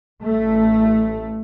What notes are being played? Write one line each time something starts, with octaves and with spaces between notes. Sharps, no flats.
A1 A3